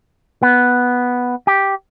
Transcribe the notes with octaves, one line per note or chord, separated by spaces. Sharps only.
B3
G4